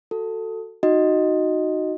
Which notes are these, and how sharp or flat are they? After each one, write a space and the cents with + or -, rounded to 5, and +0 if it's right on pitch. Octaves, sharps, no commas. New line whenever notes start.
F#4 +0 A4 +10
D#4 +0 F#4 +0 D#5 +0